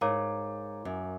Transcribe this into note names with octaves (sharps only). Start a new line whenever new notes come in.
G#2 A#4 C#5 F5 A#5 D6
F#2